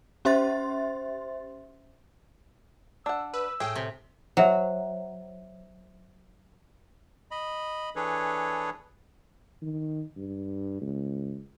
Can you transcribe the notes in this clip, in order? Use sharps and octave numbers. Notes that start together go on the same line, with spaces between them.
C#4 G4 C5 E5 C6 A6
D4 F#5 E6
B4 E6
A2 G#4 G5
C3
F#3 C5 E5
D#5 B5
E3 D4 G#4 A4 B4 C#5
D#3
G2
C#2